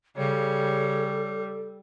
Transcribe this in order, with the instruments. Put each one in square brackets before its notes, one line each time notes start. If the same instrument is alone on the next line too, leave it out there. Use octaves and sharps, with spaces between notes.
[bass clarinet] C#3 [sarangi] G3 [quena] A4 [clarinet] C#5